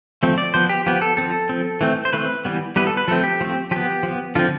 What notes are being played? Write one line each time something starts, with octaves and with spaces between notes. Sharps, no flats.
F3 A3 C4
D5
F3 B3 C5
G4
F3 B3 G4
A4
F3 C4 A4
F3 C4
E3 A3 C4
C5
E3 A3 C4 B4
E3 G3 B3
E3 G3 B3 B4
A4
B4
F3 A3 C4 A4
G4
F3 A3 C4
F3 B3 G4
F3
B3
D3 F3 C4 F4